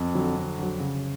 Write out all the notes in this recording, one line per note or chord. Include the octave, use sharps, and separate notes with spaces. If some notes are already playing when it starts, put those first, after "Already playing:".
Already playing: F2
D3 F#3
F2
D3 F#3
C#3